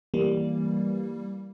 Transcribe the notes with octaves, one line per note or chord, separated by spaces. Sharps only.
E3 G3 A#3